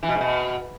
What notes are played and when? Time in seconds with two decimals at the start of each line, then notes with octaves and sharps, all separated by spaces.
0.03 E3
0.09 B2
0.15 G#2
0.21 B2